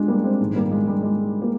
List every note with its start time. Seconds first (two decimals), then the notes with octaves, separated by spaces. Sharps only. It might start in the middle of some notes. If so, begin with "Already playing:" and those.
Already playing: G#3 D4 F4 G4
0.08 G3 A#3
0.24 G#3 C4
0.40 A#1 G#2 D#3
0.56 G3 A#3
0.72 G#3
0.87 G3
1.03 G#3
1.42 A#3